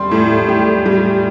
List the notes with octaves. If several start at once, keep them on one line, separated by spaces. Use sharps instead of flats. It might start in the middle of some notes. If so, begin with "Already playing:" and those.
Already playing: G3 C6
A2
G4
G3